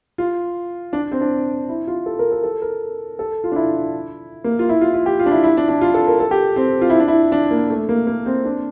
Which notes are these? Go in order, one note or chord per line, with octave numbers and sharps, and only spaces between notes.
F4
D4
C4
D4
E4
F4
A4
A#4
A4
A4
A#4
A4
F4
D4
E4
A#3
F4
E4
F4
F4
G4
F4
D4
E4
E4
D4
D4
F4
A4
A#4
A4
G4
C4
F4
E4
D4
E4
D4
A#3
A3
A#3
A#3
C4
D4